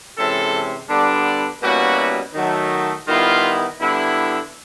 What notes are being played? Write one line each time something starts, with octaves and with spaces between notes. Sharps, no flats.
C3 E3 G#3 C#4 A4
D3 G3 B3 D4
B2 G3 A#3 C#4 E4 F#4
D#3 F#3 A3
D#3 G3 B3 E4 F4
D3 G3 B3 E4